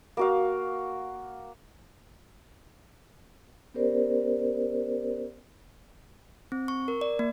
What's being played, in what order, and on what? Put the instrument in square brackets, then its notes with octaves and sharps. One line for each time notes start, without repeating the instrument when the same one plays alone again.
[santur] A#3 F#4 F5
[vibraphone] B3 C#4 G4 A#4 C5 D5
[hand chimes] C4
C#6
A#4
D5
A#3